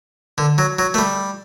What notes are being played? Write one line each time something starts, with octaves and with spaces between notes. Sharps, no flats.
D3
F#3
F#3
A3
G3